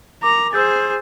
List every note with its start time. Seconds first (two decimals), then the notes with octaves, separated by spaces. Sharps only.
0.23 A#4 A#5 D6
0.53 G#4 C5 E6 G6 A6